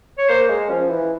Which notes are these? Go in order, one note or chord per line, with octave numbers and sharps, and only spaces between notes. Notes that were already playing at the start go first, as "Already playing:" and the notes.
C#5
A#3 C5
G#3
F3 C#4
E3